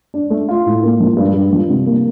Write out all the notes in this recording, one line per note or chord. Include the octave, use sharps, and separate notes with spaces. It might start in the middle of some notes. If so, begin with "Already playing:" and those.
D4
A3
F4
A2
A#3
F3
G2
G2
F3
C3
A#3